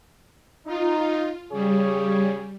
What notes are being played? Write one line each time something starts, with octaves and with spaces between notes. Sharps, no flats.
D#4 F4
C#3 G3 G#4 C#5